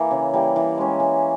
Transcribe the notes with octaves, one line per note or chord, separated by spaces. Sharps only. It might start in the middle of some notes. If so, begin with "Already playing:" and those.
Already playing: E3 A#3
C#3
E3 G3 A#3
E3
G#3 C#4
E3